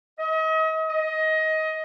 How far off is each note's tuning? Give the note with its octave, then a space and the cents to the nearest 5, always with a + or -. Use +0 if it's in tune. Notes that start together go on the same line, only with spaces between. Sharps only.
D#5 +40
D#5 +20